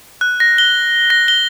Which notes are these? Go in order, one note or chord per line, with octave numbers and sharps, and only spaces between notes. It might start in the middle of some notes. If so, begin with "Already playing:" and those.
F#6
A#6
G7
A#6
G7